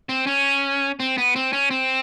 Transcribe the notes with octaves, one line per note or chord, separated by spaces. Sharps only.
C4
C#4
C4
B3
C4
C#4
C4